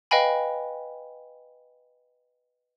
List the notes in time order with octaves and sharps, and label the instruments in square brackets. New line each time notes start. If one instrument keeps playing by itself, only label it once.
[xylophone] B4 D#5 F5 G5 G#5 B5